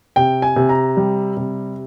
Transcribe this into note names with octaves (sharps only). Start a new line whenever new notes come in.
C3 G5
G#5
C3
A#5
G3
C3